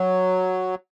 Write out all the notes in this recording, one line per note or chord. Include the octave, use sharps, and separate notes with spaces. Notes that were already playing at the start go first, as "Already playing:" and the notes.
Already playing: F#3